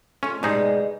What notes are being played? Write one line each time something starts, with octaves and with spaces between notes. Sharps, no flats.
A3 C#4 F4
G#2 B2 G3 G#3 D#4 G#4